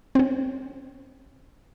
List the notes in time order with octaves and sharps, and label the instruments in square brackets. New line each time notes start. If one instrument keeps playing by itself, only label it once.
[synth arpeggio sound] C4 C#4